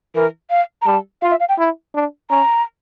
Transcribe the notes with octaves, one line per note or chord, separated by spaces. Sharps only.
E3 A#4
F5
A#5
G3 A5
F4 F5
E5
F5
G5
E4
D4
C#4 A#5